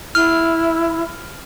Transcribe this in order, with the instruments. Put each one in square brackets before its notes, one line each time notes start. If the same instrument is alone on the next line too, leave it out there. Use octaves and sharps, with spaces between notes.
[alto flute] E4 [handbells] F6